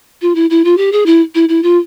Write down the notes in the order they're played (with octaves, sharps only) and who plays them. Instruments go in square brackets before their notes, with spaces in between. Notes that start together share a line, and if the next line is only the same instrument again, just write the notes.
[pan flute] F4
E4
E4
F4
G4
G#4
E4
E4
E4
F4